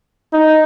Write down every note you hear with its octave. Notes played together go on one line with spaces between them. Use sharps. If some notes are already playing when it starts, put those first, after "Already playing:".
D#4